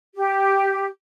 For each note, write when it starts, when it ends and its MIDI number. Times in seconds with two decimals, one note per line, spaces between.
0.15 0.86 67